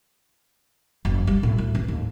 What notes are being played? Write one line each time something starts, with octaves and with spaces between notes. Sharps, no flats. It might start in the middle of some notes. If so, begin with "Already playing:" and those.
F#1
G3
A2
D2
A1
D#2